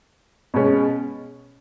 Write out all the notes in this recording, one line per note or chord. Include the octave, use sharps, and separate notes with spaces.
B2 G#3 C#4